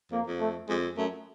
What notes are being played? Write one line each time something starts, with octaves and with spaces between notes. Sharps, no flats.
F2 A#3
F2
A3
F2 G#3
F#2 A3